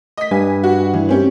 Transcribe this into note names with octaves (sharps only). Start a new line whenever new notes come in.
D#5 B6
G2 G#5
F#4
E3
C4 C#4 G4